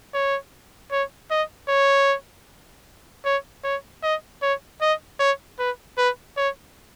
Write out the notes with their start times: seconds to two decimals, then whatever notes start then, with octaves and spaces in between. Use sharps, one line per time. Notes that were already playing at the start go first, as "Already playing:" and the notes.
0.14 C#5
0.92 C#5
1.31 D#5
1.69 C#5
3.25 C#5
3.64 C#5
4.03 D#5
4.42 C#5
4.82 D#5
5.20 C#5
5.59 B4
5.98 B4
6.37 C#5